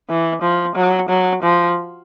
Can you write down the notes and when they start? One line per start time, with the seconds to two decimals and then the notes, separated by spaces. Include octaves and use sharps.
0.09 E3
0.42 F3
0.75 F#3
1.09 F#3
1.43 F3